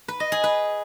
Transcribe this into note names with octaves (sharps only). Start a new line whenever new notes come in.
B4
D#5
G#4
B4